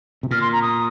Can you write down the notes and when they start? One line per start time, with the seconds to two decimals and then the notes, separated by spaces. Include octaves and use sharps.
0.23 C3
0.31 A#2 F6
0.41 C6
0.52 A#5
0.62 D#6